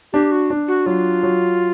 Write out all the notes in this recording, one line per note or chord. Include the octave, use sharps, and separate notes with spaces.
D4 G4
F#4
D4
F#4
F#3 F4
F#3